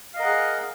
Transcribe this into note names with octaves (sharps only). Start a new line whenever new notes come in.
G#4 A#4 D#5 F5 F#5